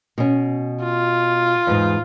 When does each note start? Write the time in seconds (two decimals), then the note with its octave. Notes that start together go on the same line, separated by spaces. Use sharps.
0.18 B2 C#4
0.84 F4
1.67 E2 G#2